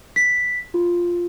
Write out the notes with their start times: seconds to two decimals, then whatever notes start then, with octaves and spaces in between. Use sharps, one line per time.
0.16 B6
0.74 F4